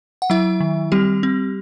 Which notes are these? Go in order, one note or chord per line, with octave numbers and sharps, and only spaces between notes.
F#5
F#3 E4 E5
D#3
G3 C4 G4
C4